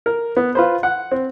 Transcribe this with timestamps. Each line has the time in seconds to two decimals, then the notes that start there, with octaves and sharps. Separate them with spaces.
0.06 A#4
0.37 B3
0.55 F4 B4 C5
0.83 F#5
1.12 C4